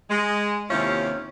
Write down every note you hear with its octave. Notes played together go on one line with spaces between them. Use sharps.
G#3
D#2 C3 C#4 E4 F4 C#5